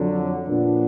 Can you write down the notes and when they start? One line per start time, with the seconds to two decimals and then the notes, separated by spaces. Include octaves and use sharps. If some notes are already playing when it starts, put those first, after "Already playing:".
Already playing: F2 D3 F#3
0.48 A#2 F3 B3 D4